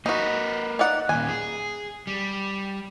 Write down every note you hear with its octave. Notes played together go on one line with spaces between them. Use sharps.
A#3 D#4 F#4 B4
D#4 D5 F#5
D#2 A#2 G#5
G#4
G3